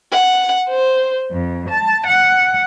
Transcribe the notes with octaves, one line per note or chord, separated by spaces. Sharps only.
F#5
C5
F2
A5
F#5